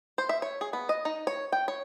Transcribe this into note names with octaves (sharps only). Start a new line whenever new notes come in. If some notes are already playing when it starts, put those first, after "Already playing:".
C5
E5
C#5
G#4
B3
D#5
D#4
C#5
G5
C#5